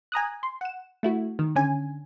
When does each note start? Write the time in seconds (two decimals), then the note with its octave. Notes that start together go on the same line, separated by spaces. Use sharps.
0.12 G#5 A#5 D#6 F#6
0.43 C6
0.61 F#5 E7
1.03 A3 E4 F#4
1.39 D#3
1.55 D3 C#4 G#5